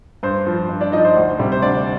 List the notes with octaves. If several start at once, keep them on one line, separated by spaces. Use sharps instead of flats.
G2 C5
F3
G2
D4 D5
F3 D#4 D#5
C5
D2
C3 G3
C5
D2 D4 D5